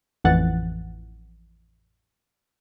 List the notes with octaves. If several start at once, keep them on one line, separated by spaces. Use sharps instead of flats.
A1 F2 E3 F#5 F#6 A6